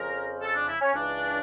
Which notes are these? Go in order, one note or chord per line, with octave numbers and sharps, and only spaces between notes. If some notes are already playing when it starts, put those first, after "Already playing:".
Already playing: F2 C#3 F3 A#4
A4
D4
E4
C#4
C#2 C#3 E3 D4